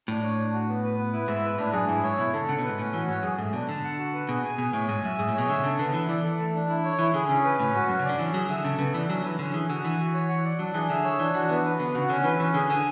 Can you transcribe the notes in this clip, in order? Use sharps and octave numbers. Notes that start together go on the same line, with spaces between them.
A2 D4
C#5
D4
F#4
B3
B4
B3
E4
G#2 E5
B4
A2 D4
F#2 G#4
G#2 E4
G#2 C#5
B2 E4
D3 A4
C#3 F#5
B2
B4
G#2
A2 C#4
E3 F#4
G#2 C#5
F#2 G#4
G#2 A3
B2 D4
D3 A5
F#5
F#4
B4
B2 G#4
G#5
B2 G#4
A2 C#5
G#2 G#5
F#2 E5
G#2 G#4
A2
B2 C#5
D3 E5
C#3 A4
D3 B3
E3 E4
E3 D5
A4
A3
D4
E4
C#5
E3 E4
D3 G#4
C#3 C#4
B4
A2 C#4
G#2 F#4
F#2 C#4
C#3
D3 D5
E3 C#4
F#3 G#4
D3 E5
C#3 A4
C#3 B3
E3 D4
F#3 C#4
E3 B4
D3 C#4
E3 G#4
D3 F#4
E3 G#5
F#4
C#5
F#5
D5
F#3 D4
E3 G#4
D3 E5
C#5
E3 D4
E3 F#4
E3 B3
B4
D3 B3
C#3 F#4
D3 C#4
E3 B4
E3 C#4
D3 G#4
D3 G#5